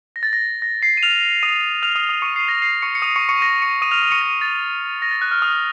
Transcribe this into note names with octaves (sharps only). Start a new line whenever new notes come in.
A#6
A6
A#6
A#6
C7
D#7
F6 F7
D#6 D#7
F6 F7
D#6 D#7
D#6 D#7
C#6 C#7
C7
A#6
C7
C#6 C#7
C#7
D#6 D#7
C#6 C#7
C#6 C#7
A#6
C#6 C#7
D#6 D#7
F6 F7
D#6 D#7
C#6 C#7
A#6
A6
A#6
A6
F#6
F6
D#6